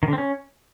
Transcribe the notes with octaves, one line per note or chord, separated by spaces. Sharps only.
D#3
D3
C4
C#4